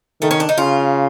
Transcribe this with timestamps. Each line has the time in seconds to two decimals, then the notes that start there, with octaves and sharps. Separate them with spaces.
0.22 D#3 A3
0.31 C#4
0.40 D4
0.49 D#4
0.58 C#3 F4